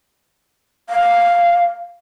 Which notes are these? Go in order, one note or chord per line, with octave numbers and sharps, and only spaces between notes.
F5